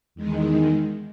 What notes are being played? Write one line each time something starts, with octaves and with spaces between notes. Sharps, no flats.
E2 D#3 G#3